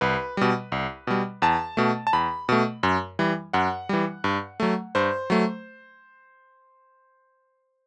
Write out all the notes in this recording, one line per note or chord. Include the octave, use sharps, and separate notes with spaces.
C2 B4
B2 G3
C2
B2 G3
E2 A5
B2 A3
A5
E2 B5
B2 A3
F#2
E3 G3
F#2 F#5
E3 G3
G2
F#3 A3
G2 C5
F#3 A3